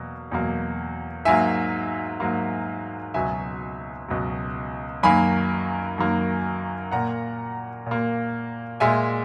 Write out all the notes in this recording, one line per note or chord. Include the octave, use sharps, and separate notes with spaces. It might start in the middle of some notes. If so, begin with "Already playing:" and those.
Already playing: E2 B2 F#3 A#3
E2 B2 F#3 A#3
G#2 F#3 A#3 E5 G#5
G#2 F#3 A#3
C#2 B2 F#3 E5 G#5
C#2 B2 F#3
F#2 D#3 F#3 A#3 G#5 B5
F#2 D#3 F#3 A#3
A#2 A#3 F#5 A#5
A#2 A#3
A#2 G#3 E5 G#5